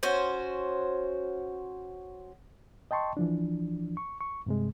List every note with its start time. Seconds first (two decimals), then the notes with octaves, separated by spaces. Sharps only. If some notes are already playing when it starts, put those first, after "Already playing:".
0.03 C#4 F#4 C5
2.91 D#5 G5 A5 C6 C#6
3.17 E3 F3 D4
3.97 C#6
4.21 C#6
4.46 G2 C3 G#3